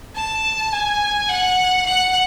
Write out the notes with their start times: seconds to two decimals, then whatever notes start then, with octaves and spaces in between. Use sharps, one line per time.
0.16 A5
0.73 G#5
1.29 F#5
1.86 F#5